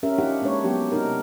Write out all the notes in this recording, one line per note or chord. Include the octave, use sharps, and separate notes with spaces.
C#4 G4 A#4 E5
D4 D#4 F4 G4 F#5
G#3 A#3 D4 B4 C#5
F#3 B3 G4
C3 A#3 D4 D#4 A#4